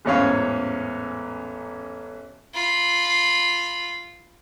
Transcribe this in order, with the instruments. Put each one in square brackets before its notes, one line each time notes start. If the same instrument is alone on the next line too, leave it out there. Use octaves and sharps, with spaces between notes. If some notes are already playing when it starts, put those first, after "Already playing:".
[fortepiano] A1 E2 G#2 C#4 C#5 F5
[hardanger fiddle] F4 B5